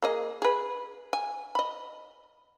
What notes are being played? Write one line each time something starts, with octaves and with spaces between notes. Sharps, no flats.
A#3 G#4 D#5
G#4 B4
G#5
D#5 B5